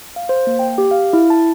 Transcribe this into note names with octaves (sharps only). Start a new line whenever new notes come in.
F5
C5
A#3
G5
G4
F5
E4
A5